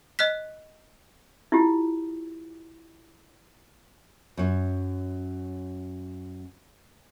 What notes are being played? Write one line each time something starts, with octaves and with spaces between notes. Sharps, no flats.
D#5 F6 F#6 B6
E4 F4 G4
F#2 C#5